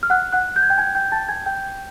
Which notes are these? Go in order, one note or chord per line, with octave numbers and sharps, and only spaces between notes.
F6
F#5 F#6
F#5 F#6
G6
G#6
G5 G6
G#5 G#6
G5 G6
A5 A6
G#5 G#6
G5 G6